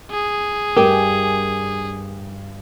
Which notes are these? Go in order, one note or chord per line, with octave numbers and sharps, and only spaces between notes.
G#4
G2 G4 A#4 G5 G#5